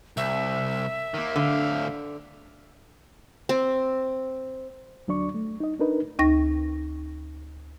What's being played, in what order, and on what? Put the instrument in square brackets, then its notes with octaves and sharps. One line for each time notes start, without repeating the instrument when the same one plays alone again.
[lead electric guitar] C2 [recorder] E5
[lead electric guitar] D#3 A#3
[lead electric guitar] D2 F5 [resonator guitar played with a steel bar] D3
[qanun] C4
[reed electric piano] D2 F#3 D4 D5 C#6
A3
D#4 D#5
D4 D#4 A#4 B4 D#5
[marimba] D2 D#4 G5 C#6 A#6